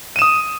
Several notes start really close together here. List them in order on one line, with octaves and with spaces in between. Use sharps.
D#7 E7 D#6